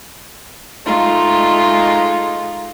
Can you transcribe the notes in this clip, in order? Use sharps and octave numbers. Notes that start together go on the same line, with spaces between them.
G#3 A3 D#4 F4